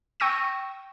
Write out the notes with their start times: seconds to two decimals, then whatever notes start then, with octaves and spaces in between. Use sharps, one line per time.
0.20 G5 C#6 E6 A#6 D#7